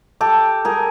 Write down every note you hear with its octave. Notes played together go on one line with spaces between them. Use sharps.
G4 A4
G#4 A#4